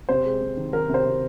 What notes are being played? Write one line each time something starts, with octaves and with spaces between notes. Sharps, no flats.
C3 C5
G#3
C3
D#3
D#3 A#4
C3 C5
C3